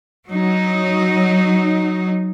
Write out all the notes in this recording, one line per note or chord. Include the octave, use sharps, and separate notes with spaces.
F#3 D#4